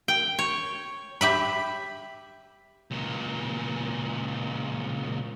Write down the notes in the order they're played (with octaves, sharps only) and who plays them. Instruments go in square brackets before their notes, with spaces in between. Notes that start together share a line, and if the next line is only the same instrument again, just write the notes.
[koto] G5
C#5
[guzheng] G4 E5 B5
[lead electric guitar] C#2 A#2